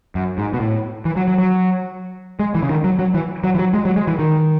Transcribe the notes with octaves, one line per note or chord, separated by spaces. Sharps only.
F#2
G#2
B2
A2
E3
F#3
F#3
F#3
G#3
E3
C#3
D#3
F#3
F#3
E3
F#3
E3
F#3
G#3
F#3
G#3
E3
D#3